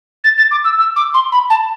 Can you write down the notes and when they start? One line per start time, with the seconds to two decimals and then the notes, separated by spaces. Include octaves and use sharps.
0.24 A6
0.37 A6
0.51 D6
0.64 E6
0.78 E6
0.96 D6
1.14 C6
1.32 B5
1.50 A5